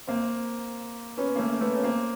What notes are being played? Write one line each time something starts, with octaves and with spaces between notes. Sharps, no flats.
A#3 C4
B3 C#4
A#3
A3 B3
A3 B3
C#4
A#3 C4